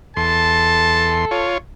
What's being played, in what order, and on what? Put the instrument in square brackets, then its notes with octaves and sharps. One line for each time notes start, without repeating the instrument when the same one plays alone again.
[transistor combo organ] E2 C6 [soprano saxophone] A4 [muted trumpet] A5
[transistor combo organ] F4 C#5